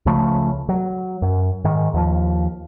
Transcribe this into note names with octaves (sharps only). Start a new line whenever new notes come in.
C#2 C#3 F3 A3
F#3
F#2
G#2 D#3
D#2 F3